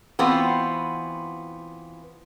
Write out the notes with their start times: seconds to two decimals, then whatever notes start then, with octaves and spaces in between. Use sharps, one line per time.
0.19 E3 B3 C4 F4 F#4